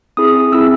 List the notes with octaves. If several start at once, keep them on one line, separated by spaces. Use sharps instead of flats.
C4 E4 G#4 D#6
C4 E4 G#4 E6